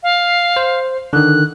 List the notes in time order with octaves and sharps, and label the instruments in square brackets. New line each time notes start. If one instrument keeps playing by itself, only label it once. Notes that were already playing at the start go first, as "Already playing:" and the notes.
[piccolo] F5
[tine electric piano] C5
[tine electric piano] D3 D#3 [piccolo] F#6